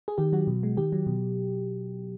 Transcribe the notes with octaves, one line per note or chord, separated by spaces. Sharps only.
G#4
D#3 G4
F#3 F#4
B2
G#3
D#3 G4
F#3
B2